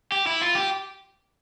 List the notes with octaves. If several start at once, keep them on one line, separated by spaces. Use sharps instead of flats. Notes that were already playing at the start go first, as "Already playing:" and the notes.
G4
E4
F4
G4